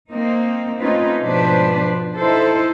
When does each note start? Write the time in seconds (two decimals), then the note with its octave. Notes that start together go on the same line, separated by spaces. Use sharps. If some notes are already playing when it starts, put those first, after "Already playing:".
0.11 A#3 C4 D#4
0.80 A3 C4 C#4 D#4 F4 B4
1.22 G#2 B2 F3 D4 B4 C5
2.17 D#4 E4 A4 C5